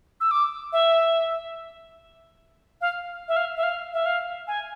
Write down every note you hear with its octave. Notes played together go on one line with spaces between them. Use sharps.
E6
D6
E5
F5
E5
F5
E5
F5
E5
F5
G#5